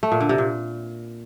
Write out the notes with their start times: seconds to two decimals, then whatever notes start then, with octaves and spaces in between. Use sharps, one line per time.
0.03 A3
0.12 A#2
0.20 D3
0.29 C3
0.38 A#2